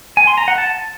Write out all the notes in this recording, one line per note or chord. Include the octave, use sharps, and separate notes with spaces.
G#5
C6
A#5
F#5
A5